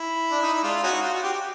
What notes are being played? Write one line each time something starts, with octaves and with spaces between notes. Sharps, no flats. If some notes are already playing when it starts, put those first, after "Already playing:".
Already playing: E4
D4
D#4
E4
G#3 D4 F4
C#4 D#4 F#4
F4
F#4
G4
G4